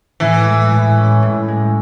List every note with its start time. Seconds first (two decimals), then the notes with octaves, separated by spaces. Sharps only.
0.20 A2 E3
0.46 G#3
0.72 A2
0.97 C#4
1.23 A2
1.48 G#3